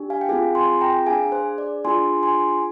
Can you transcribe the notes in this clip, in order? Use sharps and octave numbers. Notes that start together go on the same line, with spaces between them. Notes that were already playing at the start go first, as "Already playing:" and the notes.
Already playing: D4 G4
F5 G#5
G5
C4 F4 G#4 F5 G#5
G#5 C6
G5 A#5
D4 G#4 F5 G#5
C5
D5
D4 F4 G#4 G#5 C6
G#5 C6